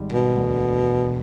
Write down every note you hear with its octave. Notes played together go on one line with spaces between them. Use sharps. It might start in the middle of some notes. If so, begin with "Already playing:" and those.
Already playing: G#1 G#2 D#3 G3
B2
E1 D2 D3